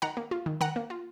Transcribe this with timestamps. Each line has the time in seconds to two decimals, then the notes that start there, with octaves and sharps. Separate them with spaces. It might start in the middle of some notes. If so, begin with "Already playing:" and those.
0.02 D#3 F#5 A#5
0.17 A#3
0.31 F4
0.46 D#3
0.61 D#3 F#5 A#5
0.76 A#3
0.90 F4